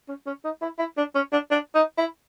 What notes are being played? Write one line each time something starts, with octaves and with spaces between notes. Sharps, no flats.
C#4
C#4
D#4
E4
E4
D4
C#4
D4
D4
D#4
E4